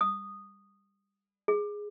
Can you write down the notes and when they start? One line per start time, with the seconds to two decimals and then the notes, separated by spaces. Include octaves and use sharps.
0.01 D#6
1.48 G#4